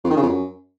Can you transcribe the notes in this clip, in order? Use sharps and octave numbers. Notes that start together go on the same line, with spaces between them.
F2
D#3
C#3
F2
F#2